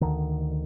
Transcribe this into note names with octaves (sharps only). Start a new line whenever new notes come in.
D2 D3 D#3